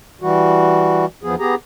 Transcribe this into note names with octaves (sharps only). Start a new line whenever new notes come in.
E3 G3 F#4
E2 F3 B3 G#4
B3 G4 G#4 A#5